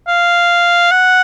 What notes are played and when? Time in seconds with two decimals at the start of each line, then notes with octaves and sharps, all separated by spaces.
0.08 F5
0.91 F#5